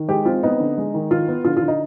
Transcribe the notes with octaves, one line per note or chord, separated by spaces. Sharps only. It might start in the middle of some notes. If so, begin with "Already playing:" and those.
Already playing: D#3
G#3 G4
C4 F4
B3 D#4
D3
G#3
D#3
D#3 F4
B3
D3 F4
F4
D3
D#4